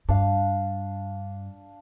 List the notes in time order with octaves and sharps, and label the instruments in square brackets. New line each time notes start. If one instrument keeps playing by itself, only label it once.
[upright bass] G2 [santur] D4 F5